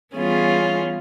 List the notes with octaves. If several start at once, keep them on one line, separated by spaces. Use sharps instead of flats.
E3 G3 B3 C#4 F4 G#4